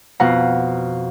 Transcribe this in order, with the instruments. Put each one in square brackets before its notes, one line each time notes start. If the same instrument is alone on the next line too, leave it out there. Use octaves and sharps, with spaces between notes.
[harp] F2 B2 F4 F5 F#5 A#5